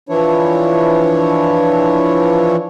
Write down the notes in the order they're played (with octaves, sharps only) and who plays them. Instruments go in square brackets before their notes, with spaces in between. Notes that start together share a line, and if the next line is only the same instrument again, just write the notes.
[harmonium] E3 F3 D4 E4 C#5